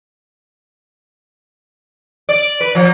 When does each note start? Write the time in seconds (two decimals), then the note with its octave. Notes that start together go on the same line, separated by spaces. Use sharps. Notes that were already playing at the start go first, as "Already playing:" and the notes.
2.29 D5
2.61 B4
2.75 F3